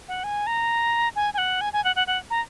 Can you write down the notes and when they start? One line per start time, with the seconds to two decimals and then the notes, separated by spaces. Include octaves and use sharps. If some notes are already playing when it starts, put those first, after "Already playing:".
0.08 F#5
0.24 G#5
0.47 A#5
1.16 G#5
1.34 G#5
1.38 F#5
1.61 G#5
1.73 G#5
1.84 F#5
1.96 F#5
2.07 F#5
2.30 A#5